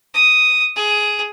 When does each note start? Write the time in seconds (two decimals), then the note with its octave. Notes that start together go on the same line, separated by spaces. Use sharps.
0.14 D#6
0.76 G#4